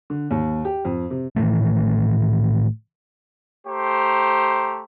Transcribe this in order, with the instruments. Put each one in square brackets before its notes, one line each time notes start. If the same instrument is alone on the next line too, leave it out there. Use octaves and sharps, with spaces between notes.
[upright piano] D3
D#2
G4
F2
C3
[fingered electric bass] A2 D#3 E3 A3
[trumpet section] A3 G4 C5 A#5